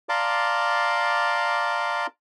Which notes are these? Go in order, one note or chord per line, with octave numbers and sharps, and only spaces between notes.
D5 F5 A5 A#5 C6 D6